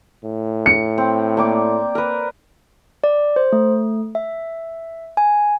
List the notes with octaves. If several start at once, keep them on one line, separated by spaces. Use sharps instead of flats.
A2
C#7
C4
A#3 D5 D6
A#4 B4
D5
C5
A3
E5
G#5